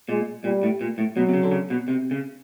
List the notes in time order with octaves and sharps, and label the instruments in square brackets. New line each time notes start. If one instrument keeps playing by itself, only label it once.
[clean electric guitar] A#2 [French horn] G#3
[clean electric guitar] A#2 [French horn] G3
[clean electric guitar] A2
A#2
A2
[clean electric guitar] B2 [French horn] F#3
[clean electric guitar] C3
C#3
D3
C#3
B2
C3
C#3